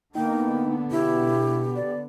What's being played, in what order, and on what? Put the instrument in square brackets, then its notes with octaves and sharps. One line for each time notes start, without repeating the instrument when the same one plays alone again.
[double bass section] D3 B3 [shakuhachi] A#3 [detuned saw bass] D#4 [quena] G5
[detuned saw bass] B2 [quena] E4 [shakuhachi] G4
[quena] D5